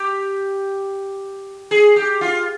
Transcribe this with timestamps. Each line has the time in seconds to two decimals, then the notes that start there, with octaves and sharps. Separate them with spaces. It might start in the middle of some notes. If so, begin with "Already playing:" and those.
Already playing: G4
1.71 G#4
1.96 G4
2.21 F4